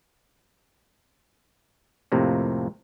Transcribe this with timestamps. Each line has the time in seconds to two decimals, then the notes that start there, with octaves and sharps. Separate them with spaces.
2.12 F2 A2 C3 A#3